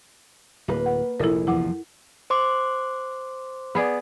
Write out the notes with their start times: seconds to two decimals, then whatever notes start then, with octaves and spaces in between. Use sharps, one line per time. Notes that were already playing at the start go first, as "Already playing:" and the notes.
0.68 D1 A#3 B4
0.86 F#5
1.20 F1 A#1 E4 A4 A#4
1.47 E2 F3 E4 F#5 D6
2.30 C5 C6 D6
3.75 B3 G#4 D5